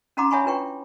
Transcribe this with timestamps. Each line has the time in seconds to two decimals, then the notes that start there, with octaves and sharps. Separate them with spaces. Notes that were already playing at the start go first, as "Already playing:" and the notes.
0.17 C#4 D#4 F#5 A#5 C6 D6
0.31 C#5 E5 F#5 G#5 B5 C#6
0.44 D4 E4 F4 B4 G5 C#6